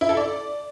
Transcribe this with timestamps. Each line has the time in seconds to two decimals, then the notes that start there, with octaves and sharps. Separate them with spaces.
0.01 E4
0.09 A4
0.17 D5